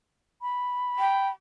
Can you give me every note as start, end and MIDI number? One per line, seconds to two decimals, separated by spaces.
0.42 1.31 83
0.99 1.28 79